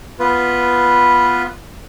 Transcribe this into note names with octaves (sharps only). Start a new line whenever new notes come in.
B3 F4 B4